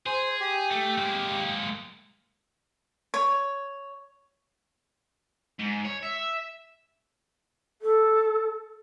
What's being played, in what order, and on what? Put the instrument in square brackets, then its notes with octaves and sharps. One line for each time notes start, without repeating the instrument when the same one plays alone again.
[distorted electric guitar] G#4 [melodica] C5
[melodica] G4
[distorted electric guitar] A3
G#3 A#3
[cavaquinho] C#5
[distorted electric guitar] G#2
C#5
E5
[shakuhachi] A4